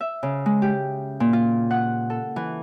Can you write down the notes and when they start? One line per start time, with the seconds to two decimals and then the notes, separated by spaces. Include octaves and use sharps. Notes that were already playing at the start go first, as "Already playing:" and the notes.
0.01 E5
0.23 C#3
0.46 G#3
0.62 G4
1.20 A#2
1.33 F4
1.71 F#5
2.10 A4
2.36 E3